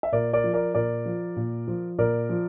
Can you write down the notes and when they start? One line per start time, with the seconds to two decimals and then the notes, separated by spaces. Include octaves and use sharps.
0.03 E5
0.12 A#2 A#4 D5
0.33 A#4 D5
0.44 F3
0.53 A#4 D5
0.74 A#2 A#4 D5
1.06 F3
1.36 A#2
1.68 F3
1.98 A#2 A#4 D5
2.29 F3